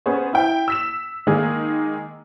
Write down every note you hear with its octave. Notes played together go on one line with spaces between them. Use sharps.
B3 C#4 G#4 C5 C#5
E4 G5
E6 B6 E7
D#3 G#3 A#3 D#4 G#4